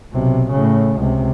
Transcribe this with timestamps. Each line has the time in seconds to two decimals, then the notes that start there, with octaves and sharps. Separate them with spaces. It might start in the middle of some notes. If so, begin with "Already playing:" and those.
0.13 B1 C3
0.52 A2 C#3
0.98 C#2 C3